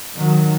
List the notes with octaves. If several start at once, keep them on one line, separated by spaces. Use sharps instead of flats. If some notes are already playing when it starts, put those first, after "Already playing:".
D#3 F#3